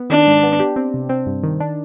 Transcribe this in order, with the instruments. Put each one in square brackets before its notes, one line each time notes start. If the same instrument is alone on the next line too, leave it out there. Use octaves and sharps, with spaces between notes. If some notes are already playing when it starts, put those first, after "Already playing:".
Already playing: [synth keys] B3
[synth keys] D#3 [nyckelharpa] D4
[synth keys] G#2
B3
G4
C4
C3
C4
G2
D#3
D4